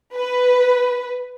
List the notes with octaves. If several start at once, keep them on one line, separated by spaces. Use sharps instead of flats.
B4